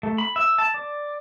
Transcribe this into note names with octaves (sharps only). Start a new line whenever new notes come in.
A3
B5
E5
A5
D5